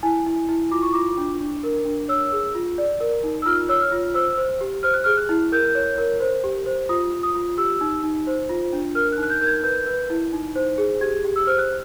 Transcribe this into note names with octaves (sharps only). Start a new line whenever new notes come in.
E4 G#5
E4
E4
F4 D6
C#6
F4 D6
D4
D4
A#4
D4
C#5 E6
G#4
F4
D5
A#4
D#4
E6
F4 F6
C#5 E6
F6
F4
C5 E6
C5
G4
C5 F6
F#6
G#4 F6
F#6
E4
A#4 G6
C#5
A#4
C5
G4
C5
F4 D#6
F4
D#6
F4
G4 E6
D#4
D#4
C5
F4
D4
A#4 F6
F#6
D#4
F#6
G6
A#4 G6
G#6
B4 G6
B4
E4
D#4
C5
G#4
G4 G#6
G4
E6
C5 F6
F#6